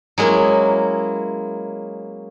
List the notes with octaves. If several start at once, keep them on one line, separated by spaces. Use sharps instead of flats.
F#3 G#3 A#3 C#4 E4